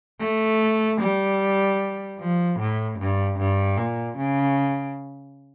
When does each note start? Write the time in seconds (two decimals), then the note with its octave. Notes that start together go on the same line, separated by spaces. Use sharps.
0.20 A3
0.99 G3
2.19 F3
2.59 A2
2.98 G2
3.38 G2
3.77 A#2
4.17 C#3